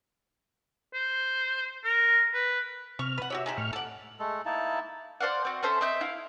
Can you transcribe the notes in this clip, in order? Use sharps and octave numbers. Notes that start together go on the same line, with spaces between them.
C5
A#4
B4
C3 C#6 F6
B4 F#5
F#4 G4 C#5 E5
G#3 D#4 G4
A2 C#6 F6
A4 F#5 D6
G#3 A3 A4
A#3 D#4 E4 A5
C5 D5 F5 F#5
C4 F#4
C#4 A4 C5 E5
C4 D#5 E5 G6
E4 F5